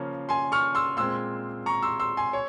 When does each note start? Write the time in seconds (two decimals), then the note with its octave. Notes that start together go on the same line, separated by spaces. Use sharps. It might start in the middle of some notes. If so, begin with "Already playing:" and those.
Already playing: C#3 F3 A#3 C#4
0.29 G#5 C6
0.52 C#6 F6
0.75 C6 E6
0.97 A#2 G#3 C4 C6 E6
1.66 A#5 C#6
1.82 C6 E6
2.00 C6 E6
2.17 G#5 C6
2.33 C#5